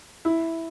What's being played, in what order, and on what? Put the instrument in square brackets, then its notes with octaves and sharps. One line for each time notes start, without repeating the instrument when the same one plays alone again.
[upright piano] E4